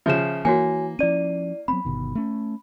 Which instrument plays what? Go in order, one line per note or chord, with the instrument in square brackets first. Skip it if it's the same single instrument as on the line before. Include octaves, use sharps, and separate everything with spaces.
[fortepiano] C#3 F3 [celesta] E5 E7
[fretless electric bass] E3 [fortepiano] A#3 [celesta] F#4 C#5 G#5
[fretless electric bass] F3 C#4 [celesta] E4 D5 D#7
[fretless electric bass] F#3 B3 C4 [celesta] B5
[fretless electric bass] G1 B2 D#3
A3 C#4